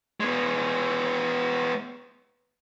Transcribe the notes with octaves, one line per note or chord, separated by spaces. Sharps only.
G#3 B3